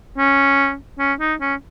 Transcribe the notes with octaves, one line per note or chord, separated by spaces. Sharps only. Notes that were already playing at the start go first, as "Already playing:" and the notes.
C#4
C#4
D#4
C#4